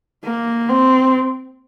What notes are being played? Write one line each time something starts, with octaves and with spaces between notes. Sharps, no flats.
A#3
C4